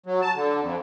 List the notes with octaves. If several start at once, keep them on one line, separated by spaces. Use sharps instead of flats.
F#3
A5
D3
F2